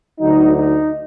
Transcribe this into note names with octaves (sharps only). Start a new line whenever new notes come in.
D2 D3 F#3 D#4
D#4